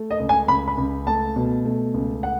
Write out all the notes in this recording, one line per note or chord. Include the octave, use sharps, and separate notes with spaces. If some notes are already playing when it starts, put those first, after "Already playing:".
Already playing: A3
D#5
C#2
G#5
C#2 B5
B5
C#2
A3 A5
B2
A3
C#2
F#5